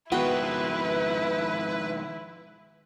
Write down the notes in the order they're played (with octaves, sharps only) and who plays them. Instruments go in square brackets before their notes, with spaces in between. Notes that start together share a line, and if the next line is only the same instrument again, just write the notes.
[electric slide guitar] D#3 F3 G#3 [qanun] B3 F#4 G5 [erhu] E4 [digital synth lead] B4